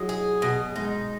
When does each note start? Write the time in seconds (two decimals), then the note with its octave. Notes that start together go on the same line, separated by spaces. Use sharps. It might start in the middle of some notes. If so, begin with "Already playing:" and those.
Already playing: F#3 G#3 E4 F#4
0.09 G#4
0.42 B2
0.76 G#3 D#4